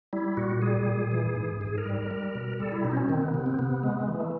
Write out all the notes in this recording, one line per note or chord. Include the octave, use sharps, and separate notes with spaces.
G3 E4
A#2 F#4
G3 G#4
A#2
E3
G#2
G#2 G#4
A#4
G3
A#4
G3
B2
G3 A4
E4
B2 D#4
C4
C#4
D#3 C4
B3
C3 B3
C4
C3 B3
G#3
E3
A3